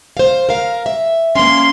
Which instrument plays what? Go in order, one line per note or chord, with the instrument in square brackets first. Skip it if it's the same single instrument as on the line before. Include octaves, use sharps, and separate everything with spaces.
[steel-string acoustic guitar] C5 F5
A#4 F5
E5
[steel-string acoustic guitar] A#3 C#4 [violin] C6